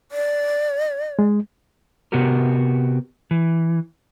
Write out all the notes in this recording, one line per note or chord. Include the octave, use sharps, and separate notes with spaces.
D5
G#3
C3 B3 F#4 G4 A#4
E3